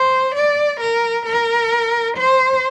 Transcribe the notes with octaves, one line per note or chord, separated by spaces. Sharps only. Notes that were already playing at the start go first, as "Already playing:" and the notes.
Already playing: C5
D5
A#4
A#4
C5